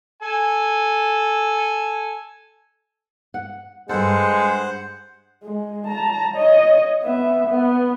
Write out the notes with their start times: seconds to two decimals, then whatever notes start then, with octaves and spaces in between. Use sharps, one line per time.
0.22 A4 G#5
3.34 F#5
3.89 G2 G#3 A4 C5 F#5
5.43 G#3
5.87 A5 A#5
6.35 C#5 D#5
7.03 B3 E5
7.47 B3